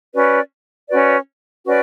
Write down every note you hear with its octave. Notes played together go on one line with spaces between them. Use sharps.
C#4 F#4 B4 D5
C#4 F#4 B4 D5
C#4 F#4 B4 D5